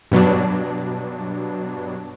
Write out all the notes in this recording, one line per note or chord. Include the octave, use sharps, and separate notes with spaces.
G2 B2 F#3 D4